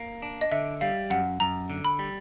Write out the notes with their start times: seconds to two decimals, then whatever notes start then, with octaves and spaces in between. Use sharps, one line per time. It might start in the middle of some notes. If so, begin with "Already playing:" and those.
Already playing: A#3
0.22 D4
0.41 D#5
0.52 D3 E5
0.81 G3 F5
1.10 F#2 F#5
1.40 F#2 A#5
1.70 D3
1.85 B5
1.99 G3